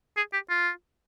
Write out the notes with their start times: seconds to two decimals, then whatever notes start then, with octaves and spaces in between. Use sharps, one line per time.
0.17 G#4
0.33 G4
0.50 F4